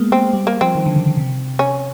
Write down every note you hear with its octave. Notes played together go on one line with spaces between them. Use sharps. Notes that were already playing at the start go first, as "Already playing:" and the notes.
Already playing: G#3 A#3 B3
G#3 C4
G3
A#3
F3 C4
D#3
D3
C#3
C#3
C3
C#4